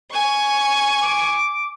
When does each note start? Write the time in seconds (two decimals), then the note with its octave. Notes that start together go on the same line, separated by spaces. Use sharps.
0.12 G#5 C#6
1.02 D6